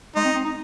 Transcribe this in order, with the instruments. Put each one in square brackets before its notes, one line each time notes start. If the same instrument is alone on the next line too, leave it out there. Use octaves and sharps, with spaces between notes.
[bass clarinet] G#3 [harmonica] D#4
[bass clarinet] C4
C4
D#4